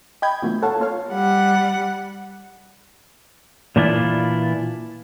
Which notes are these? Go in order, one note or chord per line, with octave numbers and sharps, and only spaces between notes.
D#5 G5 B5 G6 G#6
A#2 D3 E3 F#3 A3 B3
A4 C#5 F5 F#5 A5
A#3 F4 C#5 F5
G3 F#5
A#2 E3 D4 E4 F4